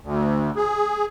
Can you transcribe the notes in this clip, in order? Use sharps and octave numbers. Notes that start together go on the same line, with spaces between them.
D2
G#4